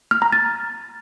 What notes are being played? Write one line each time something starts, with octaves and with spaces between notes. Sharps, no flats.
F6
A#5
A6